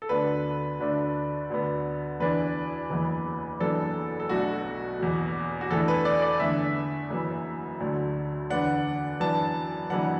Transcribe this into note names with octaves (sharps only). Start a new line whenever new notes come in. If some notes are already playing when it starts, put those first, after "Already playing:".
A4
D2 D3 B3 D4 B4
D2 D3 A3 D4
D2 D3 B3
E2 E3 D4 B4
F#1 E2 E3
F#1 F#2 E3 B3 D4 A4
A4
B1 B2 A3 D4 F#4
F#1 E2 B2 F#3
F#4
E2 E3 A3 D4 A4
B4
D5
D5
E2 D3 A3 D4 E5
F#1 F#2 E3 B3
D2 D3 F#3 A3
E2 D3 B3 D4 F#5
F#2 E3 B3 D4 A5
F#1 F#2 E3 D4 F#5